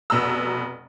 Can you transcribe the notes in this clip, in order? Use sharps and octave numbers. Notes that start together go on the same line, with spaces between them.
F1 B2 A#5 E6